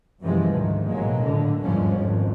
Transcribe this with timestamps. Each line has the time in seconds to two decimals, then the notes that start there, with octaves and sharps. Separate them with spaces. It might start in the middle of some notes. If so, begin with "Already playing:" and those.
0.21 F#2 C3 E3 F3 G3 G#3
0.51 D2 G#2 D#3
0.89 A1 B2 F#3 G#3 A#3
1.22 A#1 A2 D3
1.63 G1 E2 G#2 F3 G#3 C#4
1.99 G#1 F2